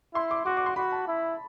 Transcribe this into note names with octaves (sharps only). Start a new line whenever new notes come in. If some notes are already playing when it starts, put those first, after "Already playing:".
E4 C6
D6
F#4 D6
D6
C6
F#4 B5
A5
E4